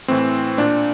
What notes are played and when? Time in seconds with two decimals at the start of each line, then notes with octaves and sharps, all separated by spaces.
0.08 A2 E3 C4
0.58 A#2 D4